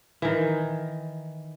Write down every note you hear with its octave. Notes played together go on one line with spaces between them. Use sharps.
D#3 E3